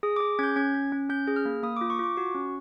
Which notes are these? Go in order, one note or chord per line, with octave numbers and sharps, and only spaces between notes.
G#4 D#6
G#4 D6
C#4 G6 G#6
C#4 G#6
C#4
C#4
C#4 G6
G#4
F6
A#3
A#3 D#6
D6
F4
C#6
F4 D6
F#4 C#6
C#4